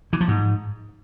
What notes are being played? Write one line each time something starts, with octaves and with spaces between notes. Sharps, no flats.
E3
F3
G#2